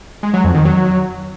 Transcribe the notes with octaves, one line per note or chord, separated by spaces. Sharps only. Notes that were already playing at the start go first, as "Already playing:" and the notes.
G#3
F#3
F2
D#3
F#3